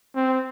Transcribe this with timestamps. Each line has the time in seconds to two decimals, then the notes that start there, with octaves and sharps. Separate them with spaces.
0.15 C4